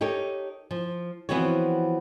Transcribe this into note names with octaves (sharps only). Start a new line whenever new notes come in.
D#4 G4 A4 A#4 C#5
F3
E3 F3 B3 C4 F#4 C#5